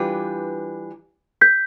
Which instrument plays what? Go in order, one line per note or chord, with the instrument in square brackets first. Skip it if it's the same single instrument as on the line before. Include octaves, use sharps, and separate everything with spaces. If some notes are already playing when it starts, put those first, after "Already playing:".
Already playing: [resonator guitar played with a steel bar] E3 G3 D4 F4 B4
[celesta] G6 B6